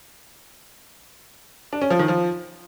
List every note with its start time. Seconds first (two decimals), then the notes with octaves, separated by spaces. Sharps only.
1.73 D4
1.82 C#4
1.90 F3
1.99 D#3
2.08 F3